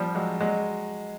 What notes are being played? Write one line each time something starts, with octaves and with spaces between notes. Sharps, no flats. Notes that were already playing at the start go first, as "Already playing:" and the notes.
Already playing: F3 G3
F#3 G#3
F#3 G#3